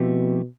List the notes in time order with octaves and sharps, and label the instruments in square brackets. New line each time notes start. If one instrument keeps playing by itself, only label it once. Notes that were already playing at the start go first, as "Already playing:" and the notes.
Already playing: [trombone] B2 [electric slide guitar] F3 A3 C4 E4 G4